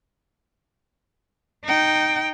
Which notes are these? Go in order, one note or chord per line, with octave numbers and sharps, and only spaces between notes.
D#4 G5